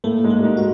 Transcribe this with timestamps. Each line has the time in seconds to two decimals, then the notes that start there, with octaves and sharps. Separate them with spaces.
0.04 A2 A3 A#3
0.24 G#2 G#3
0.30 A#3
0.39 G3
0.44 G#2 G#3
0.57 F#4